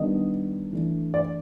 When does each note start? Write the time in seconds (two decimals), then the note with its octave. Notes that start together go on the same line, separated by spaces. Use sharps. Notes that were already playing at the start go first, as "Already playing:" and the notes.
Already playing: D#3 G3 B3 D4 D#5
0.73 E3 A3 D4
1.14 D5